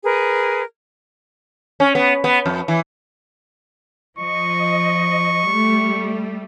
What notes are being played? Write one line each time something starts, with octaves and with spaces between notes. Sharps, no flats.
G#4 A#4 B4
C#4
B3
B3
F2
E3
F3 D#5 C#6
G3 A3